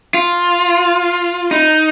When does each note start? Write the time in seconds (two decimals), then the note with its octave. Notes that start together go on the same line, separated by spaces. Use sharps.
0.14 F4
1.51 D#4